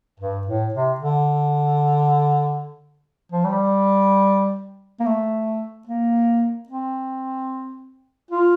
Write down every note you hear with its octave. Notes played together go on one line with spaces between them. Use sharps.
G2
A2
C3
D3
F3
G3
A#3
A3
A#3
C4
F4